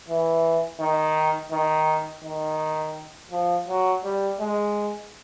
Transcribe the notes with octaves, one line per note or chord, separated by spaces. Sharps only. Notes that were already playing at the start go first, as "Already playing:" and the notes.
E3
D#3
D#3
D#3
F3
F#3
G3
G#3